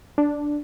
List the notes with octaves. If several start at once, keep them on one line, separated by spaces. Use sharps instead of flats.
D4